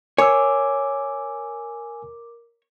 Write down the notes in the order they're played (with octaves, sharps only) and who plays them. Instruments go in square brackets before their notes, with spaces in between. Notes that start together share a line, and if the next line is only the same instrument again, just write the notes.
[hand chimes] A#4 D6 [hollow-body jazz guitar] C#5 [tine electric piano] G#5 E6